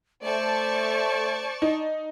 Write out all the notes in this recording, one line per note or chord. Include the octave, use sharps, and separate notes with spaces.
A3 C5 D5 A5 C#6
D#4